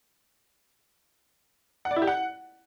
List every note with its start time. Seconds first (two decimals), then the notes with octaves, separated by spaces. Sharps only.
1.85 F#5
1.91 D5
1.96 E4
2.02 G4
2.07 F#5